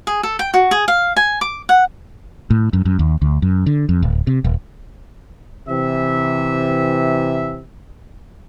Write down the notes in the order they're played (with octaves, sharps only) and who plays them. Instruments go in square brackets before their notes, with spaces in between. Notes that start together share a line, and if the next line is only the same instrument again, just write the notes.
[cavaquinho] G#4
A4
G5
F#4
G#4
F5
G#5
D6
F#5
[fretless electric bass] A2
F#2
F#2
D#2
D2
F#2
D3
F2
D1
C3
D#1
[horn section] C3 E3 E5